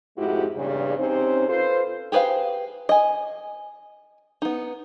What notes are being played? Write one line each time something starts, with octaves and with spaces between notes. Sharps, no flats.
F2 G#2 A3 E4 F#4 G4
E2 G2 A#2 C#3
C3 C4 C#4 D#4 C5
F4 A4 B4 C5
G4 G#4 B4 C5 F5
D#5 G#5
B3 D#4